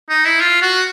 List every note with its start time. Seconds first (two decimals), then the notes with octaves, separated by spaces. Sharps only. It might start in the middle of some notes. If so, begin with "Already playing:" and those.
0.09 D#4
0.25 E4
0.41 F4
0.62 F#4